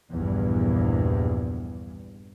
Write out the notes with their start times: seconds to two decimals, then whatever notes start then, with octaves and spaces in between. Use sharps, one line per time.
0.12 A#1 E2 G2